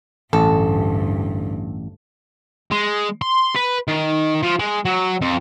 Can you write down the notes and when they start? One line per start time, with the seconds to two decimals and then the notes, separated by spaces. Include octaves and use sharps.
0.33 A1 D2 G2 A4
2.71 G#3
3.22 C6
3.56 B4
3.88 D#3
4.43 F3
4.59 G#3
4.85 F#3
5.22 F2